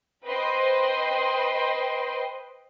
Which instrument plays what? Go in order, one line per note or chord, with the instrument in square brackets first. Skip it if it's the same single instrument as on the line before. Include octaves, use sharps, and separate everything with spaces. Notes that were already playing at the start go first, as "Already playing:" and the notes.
[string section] B4 C5 D#5 G5 B5 C6